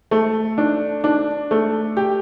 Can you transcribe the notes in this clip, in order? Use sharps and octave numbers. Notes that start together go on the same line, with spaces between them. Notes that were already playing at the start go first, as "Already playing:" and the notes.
A3
D4
D4
A3
G4